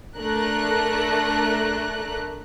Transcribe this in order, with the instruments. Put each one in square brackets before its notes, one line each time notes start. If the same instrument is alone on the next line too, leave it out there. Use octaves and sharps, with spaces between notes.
[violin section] A3 D4 A#4 F#6